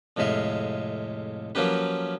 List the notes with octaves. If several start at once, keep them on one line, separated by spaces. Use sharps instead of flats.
F2 A2 C3 G#3 E5 F5
F3 F#3 A#3 C#4 G4 B4